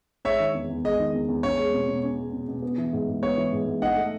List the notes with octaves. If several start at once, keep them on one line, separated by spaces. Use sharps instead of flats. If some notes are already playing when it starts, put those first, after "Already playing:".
G#3 C#5 E5
D#3
E2
E2
G#3 D#5
D#3
E2
E2
C#4 C#5
G#3
B2
B2
C#4
G#3
B2
B2
B3
E3
G#2
G#2
B3 C#5
E3
G#2
G#2
D#4 D#5 F#5
A3